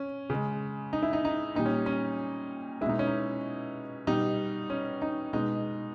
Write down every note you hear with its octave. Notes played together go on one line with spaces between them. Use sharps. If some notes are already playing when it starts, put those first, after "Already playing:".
Already playing: C#4
C#3 G#3
D#4
E4
D#4
D#4
A#2 G3 D#4
C#4
C#4
B2 G#3 D#4 E4
C#4
D#4
B2 G3 D#4
C#4
D#4
B2 G#3 D#4